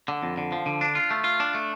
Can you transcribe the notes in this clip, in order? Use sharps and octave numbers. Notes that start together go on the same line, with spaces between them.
D3
F2
D3
F3
D3
D4
F4
A3
F4
D4
A3